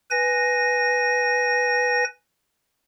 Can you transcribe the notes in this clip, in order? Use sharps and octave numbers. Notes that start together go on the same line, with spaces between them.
B4 G#5 A#6